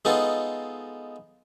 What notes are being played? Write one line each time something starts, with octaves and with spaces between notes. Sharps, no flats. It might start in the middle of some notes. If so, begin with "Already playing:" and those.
G#3 B3 D#4 F4 A4